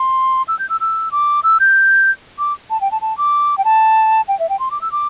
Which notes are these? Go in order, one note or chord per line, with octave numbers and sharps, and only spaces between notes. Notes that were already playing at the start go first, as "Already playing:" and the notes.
Already playing: C6
E6
G6
E6
E6
D6
E6
G6
D6
A5
G5
A5
A5
D6
G5
A5
G5
E5
G5
C6
D6
E6
D6